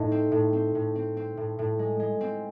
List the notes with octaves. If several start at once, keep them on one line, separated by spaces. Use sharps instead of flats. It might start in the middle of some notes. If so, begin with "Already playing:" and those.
Already playing: A2 D#4
C4
A2
C4
A2
C4
C4
A2
A2
G#3
G#3
C4